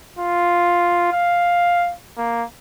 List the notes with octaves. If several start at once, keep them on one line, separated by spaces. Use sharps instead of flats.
F4
F5
A#3